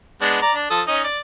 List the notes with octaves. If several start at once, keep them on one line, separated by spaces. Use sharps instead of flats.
G#3 B3 D4
D5 A#5
D4
F3 A4 D#6
C#4 D#4 D#5
D5